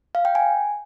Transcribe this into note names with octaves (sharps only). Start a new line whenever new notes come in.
F5
G5
G#5